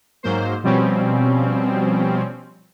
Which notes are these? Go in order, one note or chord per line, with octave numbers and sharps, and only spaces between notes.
G#2 F#3 A#3 C5
B2 F3 G3 C4 C#4